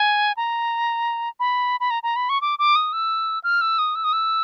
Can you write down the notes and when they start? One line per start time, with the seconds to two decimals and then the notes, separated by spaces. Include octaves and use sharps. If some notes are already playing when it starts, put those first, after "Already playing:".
Already playing: G#5
0.37 A#5
1.40 B5
1.80 B5
1.90 A#5
2.03 A#5
2.16 B5
2.29 C#6
2.41 D6
2.59 D6
2.76 D#6
2.93 E6
3.44 F6
3.61 E6
3.79 D#6
3.95 E6
4.04 D#6
4.13 E6